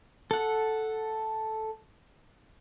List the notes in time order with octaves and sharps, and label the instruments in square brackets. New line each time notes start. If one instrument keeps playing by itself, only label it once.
[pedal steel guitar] A4 F#5